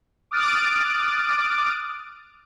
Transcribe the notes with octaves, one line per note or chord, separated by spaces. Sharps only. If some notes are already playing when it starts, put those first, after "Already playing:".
D6 D#6 F6 F#6 A6 D7